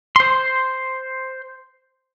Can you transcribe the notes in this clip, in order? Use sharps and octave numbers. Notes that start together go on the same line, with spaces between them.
C5 C6